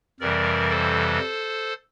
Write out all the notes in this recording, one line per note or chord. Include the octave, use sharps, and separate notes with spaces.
F2 C3 E3 G3 A#4 D5
A4 C5